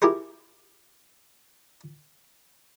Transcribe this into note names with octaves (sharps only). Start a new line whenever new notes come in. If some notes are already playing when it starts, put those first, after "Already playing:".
E4 G4 G#4 A#4 C5